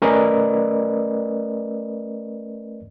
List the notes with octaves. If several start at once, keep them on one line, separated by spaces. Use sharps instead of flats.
A3 C#4 A#4 B4 D5 D#5